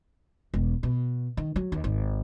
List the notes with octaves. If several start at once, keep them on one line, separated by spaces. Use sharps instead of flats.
E1
B2
D#3
F#3
D#2
G#1